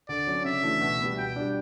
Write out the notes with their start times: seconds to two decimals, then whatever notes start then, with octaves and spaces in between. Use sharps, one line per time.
0.09 D3 D5
0.27 F#3 C#4
0.45 C#3 E5
0.63 E3 A3 D4 F#4
0.81 B2
1.00 G3 B3
1.18 B2 G5
1.36 G3 D4